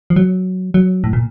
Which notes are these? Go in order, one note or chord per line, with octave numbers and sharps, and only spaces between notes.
F3
F#3
F#3
A2
A#2